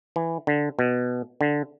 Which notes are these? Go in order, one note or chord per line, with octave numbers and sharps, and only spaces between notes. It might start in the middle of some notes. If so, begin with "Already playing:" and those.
E3
D3
B2
D3